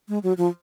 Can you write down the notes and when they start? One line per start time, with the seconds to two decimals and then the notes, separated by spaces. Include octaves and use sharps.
0.08 G#3
0.23 F#3
0.37 F3